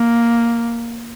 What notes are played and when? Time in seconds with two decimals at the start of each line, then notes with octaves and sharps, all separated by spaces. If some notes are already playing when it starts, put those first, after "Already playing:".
Already playing: A#3